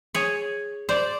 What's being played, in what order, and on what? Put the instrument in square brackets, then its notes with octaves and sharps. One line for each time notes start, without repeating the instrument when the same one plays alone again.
[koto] G#4 C#5
[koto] C5 [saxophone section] D5